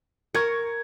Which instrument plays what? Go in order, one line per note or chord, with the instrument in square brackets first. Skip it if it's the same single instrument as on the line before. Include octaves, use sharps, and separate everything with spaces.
[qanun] A#4 [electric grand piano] C#6 G#6 C#7